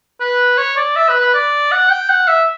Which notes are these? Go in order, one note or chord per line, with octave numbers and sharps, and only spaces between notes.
B4
C#5
D5
E5
B4
B4
D5
F#5
G5
F#5
E5